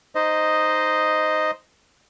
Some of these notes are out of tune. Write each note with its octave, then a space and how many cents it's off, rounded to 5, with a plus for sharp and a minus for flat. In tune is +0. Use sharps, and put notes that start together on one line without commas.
D#4 -5 C5 -10 D#5 +0